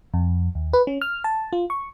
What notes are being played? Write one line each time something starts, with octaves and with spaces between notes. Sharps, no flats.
F2
D#2
B4
C#4
F6
A5
F4
C#6